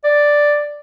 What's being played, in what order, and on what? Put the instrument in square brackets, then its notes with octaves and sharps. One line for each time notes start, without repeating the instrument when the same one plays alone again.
[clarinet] D5